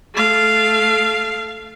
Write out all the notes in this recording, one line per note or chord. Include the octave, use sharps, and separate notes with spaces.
A3 F5